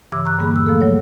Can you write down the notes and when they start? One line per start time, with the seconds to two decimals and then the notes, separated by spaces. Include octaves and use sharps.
0.12 G2 C#3 E3 D6 E6
0.25 A#5 C#6 F#6
0.39 G2 D3 G3 A#3 G#4 B5
0.51 D#2 A#2 E6
0.66 F3 A3 A#3 G#4 A4
0.81 F3 F#3 C#5